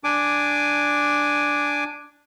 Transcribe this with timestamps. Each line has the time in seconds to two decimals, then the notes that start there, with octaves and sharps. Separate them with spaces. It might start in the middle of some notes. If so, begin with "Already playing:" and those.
0.04 D4 G#5 D6